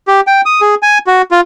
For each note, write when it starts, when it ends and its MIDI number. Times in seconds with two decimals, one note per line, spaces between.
0.08 0.21 67
0.27 0.41 79
0.46 0.61 87
0.61 0.75 68
0.83 0.98 80
1.07 1.22 66
1.31 1.41 65